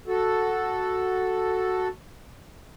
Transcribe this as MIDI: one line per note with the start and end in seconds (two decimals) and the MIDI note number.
0.07 1.88 66
0.07 1.88 69